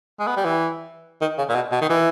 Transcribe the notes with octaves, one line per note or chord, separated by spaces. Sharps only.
G#3
B3
G3
E3
D#3
C#3
A#2
B2
B2
D#3
E3